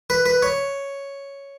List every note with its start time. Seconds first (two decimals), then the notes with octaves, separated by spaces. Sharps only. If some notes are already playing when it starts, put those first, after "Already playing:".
0.10 B4
0.26 B4
0.42 C#5